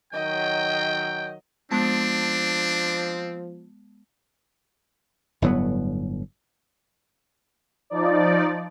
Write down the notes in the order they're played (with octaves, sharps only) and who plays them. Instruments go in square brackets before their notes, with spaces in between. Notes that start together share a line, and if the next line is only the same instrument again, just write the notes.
[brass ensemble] D#3 F#3 [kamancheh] D#5 [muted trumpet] G5
[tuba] F3 [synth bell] G#3 B3 A5 [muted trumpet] C4 [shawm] D4
[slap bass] G1 A2 F#3 B3
[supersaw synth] F3 D#4 D5